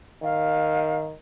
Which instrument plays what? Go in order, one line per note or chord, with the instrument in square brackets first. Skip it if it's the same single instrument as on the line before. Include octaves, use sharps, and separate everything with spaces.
[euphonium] D#3 [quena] F5